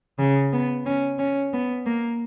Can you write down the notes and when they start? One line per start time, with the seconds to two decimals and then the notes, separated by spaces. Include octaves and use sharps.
0.18 C#3
0.53 B3
0.86 C#4
1.19 C#4
1.53 B3
1.86 A#3